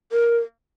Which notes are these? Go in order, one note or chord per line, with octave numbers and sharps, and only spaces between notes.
A#4